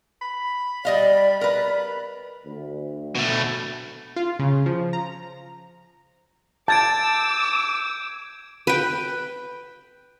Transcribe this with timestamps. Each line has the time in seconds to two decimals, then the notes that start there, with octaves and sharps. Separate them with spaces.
0.21 B5
0.85 G3 D5 D#5 F5
1.41 A#4 B4 D5
2.46 D2
3.15 B2 A3
4.16 F4
4.39 C#3
4.66 F3
4.93 A#5
6.68 A5 D6 E6 G6 G#6 D7
8.67 B4 G5